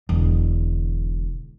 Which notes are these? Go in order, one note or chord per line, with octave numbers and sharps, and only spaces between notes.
E1 D3